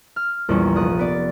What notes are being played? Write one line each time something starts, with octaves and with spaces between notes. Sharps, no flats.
F6
A#1 E2 F3 G3 C#4
F1 D#6 F#6 D#7
B3 D5